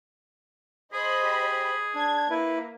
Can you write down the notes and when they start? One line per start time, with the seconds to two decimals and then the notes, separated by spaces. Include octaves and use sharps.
0.93 G#4 C5 D#5 B5
1.23 G4
1.95 D4 G#6
2.30 A#3 E4 B4